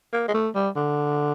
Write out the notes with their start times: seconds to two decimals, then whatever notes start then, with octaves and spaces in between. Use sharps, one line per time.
0.13 A#3
0.28 G#3
0.34 A3
0.55 G3
0.76 D3